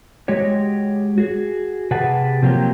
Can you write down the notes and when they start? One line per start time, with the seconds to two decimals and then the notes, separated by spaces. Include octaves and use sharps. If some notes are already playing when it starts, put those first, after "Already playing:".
0.28 G#3 F#4 G4 C#5
1.18 F#4 G#4
1.91 C3 G4 G#4 B4 F#5 A5
2.42 C3 F3 F#3 A#3 C4 G4